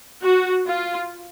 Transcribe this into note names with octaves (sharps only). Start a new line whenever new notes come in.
F#4
F4